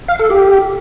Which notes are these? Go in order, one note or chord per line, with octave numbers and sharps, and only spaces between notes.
F5
A4
G4